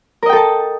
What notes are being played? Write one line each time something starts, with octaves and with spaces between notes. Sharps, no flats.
A4 A#4 D#5 G5 A5